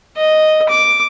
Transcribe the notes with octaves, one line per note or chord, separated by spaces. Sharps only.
D#5
D6